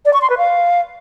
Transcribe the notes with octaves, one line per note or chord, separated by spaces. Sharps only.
D5
C#6
C6
B4
F5